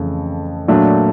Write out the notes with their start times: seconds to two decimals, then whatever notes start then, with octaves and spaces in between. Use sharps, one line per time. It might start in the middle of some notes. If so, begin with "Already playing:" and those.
Already playing: F2 C#3 E3 A3
0.68 A#2 F#3 A3 D4